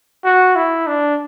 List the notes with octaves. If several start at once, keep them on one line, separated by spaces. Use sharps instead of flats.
F#4
E4
D4